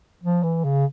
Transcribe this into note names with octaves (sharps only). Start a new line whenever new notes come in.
F3
E3
C#3